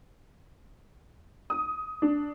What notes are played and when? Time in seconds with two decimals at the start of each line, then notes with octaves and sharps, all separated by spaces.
1.50 D#6
2.02 D4